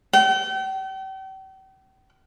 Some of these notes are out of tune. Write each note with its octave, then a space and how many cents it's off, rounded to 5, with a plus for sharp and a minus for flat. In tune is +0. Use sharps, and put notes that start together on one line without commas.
G5 -40